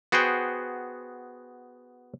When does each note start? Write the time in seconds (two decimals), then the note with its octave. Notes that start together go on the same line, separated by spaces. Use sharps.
0.12 B3 F#4 G#4 C5 G5